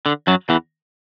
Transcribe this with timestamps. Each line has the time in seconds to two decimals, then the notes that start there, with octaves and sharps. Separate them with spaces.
0.06 D3
0.27 F#2 F#3
0.49 E2 E3